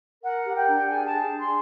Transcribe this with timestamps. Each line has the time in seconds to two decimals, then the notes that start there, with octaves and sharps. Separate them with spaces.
0.22 A#4 F#5
0.45 G4
0.55 G5
0.67 D4
0.89 G#4 G#5
1.05 A5
1.12 G#4
1.32 D4
1.38 C6